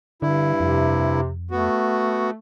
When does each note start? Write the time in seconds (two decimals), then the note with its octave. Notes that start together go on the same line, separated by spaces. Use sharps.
0.22 G2 D3 E4
0.60 F2 C3
1.51 A3 B3 F#4